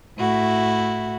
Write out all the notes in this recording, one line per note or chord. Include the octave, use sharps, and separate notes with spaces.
A2 E4 F#4